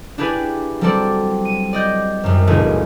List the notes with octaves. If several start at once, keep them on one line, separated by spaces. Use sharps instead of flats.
D4 E4 G4 G#4 B4 D5
F#3 G3 C4 A4 C5 D5
D#7
D5 D#5 G6
G#1 F#2
E1 C#2 A#2 A3 E4 D#5